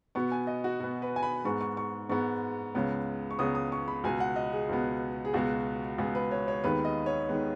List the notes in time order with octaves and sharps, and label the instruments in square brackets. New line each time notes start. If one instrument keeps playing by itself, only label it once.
[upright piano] B2 B3 C#6
G#5
D#5
F#4
B2 B3
B4
G#5
B5
G#2 G#3 B3 C#6
C#6
C#6
G#2 G#3 B3 C#6
C#2 C#3 G#3 B3
C#6
C#2 C#3 G#3 B3 D#6
D#6
C#6
B5
C#2 B2 B3 G#5
F#5
D#5
G#4
C#2 B2 B3
G#4
C#2 B2 G#3 B3 F#4
C#2 B2 G#3 B3 G#4
B4
C#5
C#5
D#2 D#3 G#3 B3 B4
D#5
C#5
D#3 G#3 B3